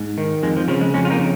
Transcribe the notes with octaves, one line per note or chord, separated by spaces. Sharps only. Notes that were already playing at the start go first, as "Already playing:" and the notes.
Already playing: G#2
D#3
F2 G#3
F3
C#3 F3
G#3
F2 G#3 C#4
F4
A#3 D#4
C#3